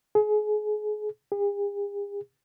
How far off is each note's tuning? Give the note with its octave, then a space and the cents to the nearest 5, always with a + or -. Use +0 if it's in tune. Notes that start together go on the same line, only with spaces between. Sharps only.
G#4 +30
G#4 -45